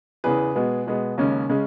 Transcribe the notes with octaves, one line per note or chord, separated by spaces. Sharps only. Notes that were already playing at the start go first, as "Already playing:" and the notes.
E2 C#3 E3 G#4 B4
B2 G#3 B3
B2 G#3 B3
D#2 C#3 G#3 C#4
C#3 G#3 C#4